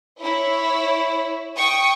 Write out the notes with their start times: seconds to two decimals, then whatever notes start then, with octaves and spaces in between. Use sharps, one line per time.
0.19 E4 C#5
1.54 G5 C#6 D#6